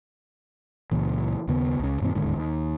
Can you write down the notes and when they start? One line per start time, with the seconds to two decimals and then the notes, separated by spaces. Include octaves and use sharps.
0.92 C#2 A#2 E3
1.48 D#2 C#3 B3
1.79 C#2 C#3
2.01 F#2 A#2 D#3 C4
2.15 D1 D#2 G#2 D3
2.36 D#2